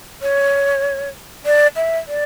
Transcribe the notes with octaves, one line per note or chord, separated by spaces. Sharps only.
C#5
D5
E5
D5